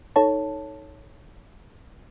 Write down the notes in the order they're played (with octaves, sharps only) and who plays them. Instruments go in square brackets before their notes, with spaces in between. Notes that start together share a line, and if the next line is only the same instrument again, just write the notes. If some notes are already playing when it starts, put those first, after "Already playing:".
[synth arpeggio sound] D#4 A4 C#5 A5